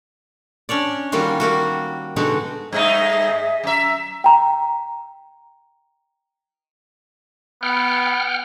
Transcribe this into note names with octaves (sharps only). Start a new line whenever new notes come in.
C#4 D4 C#5 D5
D#3 G3 A#3 F4 F#4
G3 A#3 F#4
B2 D3 G#3 D#4 F#4
G2 A3 D#4 G#4 D#5 E5
F#2 E5 A#5
G5 A#5
B3 F#5 G5 F6